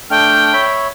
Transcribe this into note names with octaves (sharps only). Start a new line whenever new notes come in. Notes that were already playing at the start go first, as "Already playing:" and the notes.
A3 D4 G5 F6
C#5 E5 B5